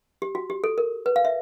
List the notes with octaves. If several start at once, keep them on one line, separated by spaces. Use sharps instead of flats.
G4
F#4
G4
A4
A#4
B4
F5
E5